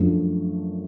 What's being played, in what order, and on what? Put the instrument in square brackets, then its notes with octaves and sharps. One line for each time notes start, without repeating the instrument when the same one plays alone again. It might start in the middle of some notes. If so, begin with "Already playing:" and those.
Already playing: [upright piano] F#2 F3 A3 D4